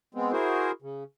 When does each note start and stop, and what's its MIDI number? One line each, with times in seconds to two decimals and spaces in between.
0.15 0.32 56
0.15 0.32 59
0.15 0.32 60
0.32 0.71 64
0.32 0.71 66
0.32 0.71 68
0.32 0.71 70
0.32 0.71 72
0.82 1.04 49